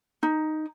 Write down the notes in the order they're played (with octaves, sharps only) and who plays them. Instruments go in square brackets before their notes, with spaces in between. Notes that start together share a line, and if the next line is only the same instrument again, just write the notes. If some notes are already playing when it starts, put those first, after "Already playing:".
[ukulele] D#4